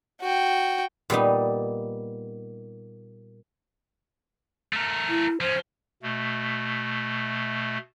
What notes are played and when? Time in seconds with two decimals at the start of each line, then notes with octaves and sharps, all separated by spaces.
0.21 F#4 G5
1.10 A#2 G3 B3 D#4
4.73 A3 A#4
5.09 E4
5.41 F3 C#4 C5
6.02 B2 A3